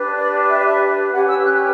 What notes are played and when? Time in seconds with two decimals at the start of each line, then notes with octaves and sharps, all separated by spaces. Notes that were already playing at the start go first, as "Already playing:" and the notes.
Already playing: D4 G4 B4
0.17 D5
0.50 E5
0.59 D5
0.66 E5
1.13 C#4 G4 B4 F#5
1.28 E6
1.45 F#6